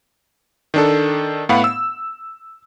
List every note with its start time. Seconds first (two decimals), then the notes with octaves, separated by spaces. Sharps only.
0.74 D#3 D4 A4
1.49 A2 B3 F5 F#5 B5
1.64 E6